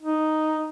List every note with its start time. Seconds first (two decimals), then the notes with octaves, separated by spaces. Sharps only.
0.02 D#4